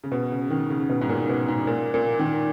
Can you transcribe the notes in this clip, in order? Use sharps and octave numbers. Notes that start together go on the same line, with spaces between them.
C#3
B2
C#3
D#3
C#3
B2
G#2
A#2
B2
G#2
A#2
A#2
D#3